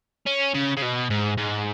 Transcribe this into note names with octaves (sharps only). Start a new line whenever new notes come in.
C#4
C#3
C#3
B2
G#2
G#2